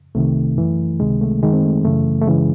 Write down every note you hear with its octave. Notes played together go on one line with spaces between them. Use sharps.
C2 C3 D#3 A3
F#2 E3
C#2 C3 D#3 G#3
A3
F#2 D#3 G#3
C4
A3
F#2 C#3 E3 A3
A3
F#2 C#3 E3 G#3